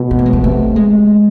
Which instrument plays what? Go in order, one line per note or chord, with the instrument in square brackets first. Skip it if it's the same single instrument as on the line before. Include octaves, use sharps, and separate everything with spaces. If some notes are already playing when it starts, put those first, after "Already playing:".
Already playing: [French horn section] B2
[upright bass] B3
A3
G#3
A3
[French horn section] C3 [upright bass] A3
[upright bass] G#3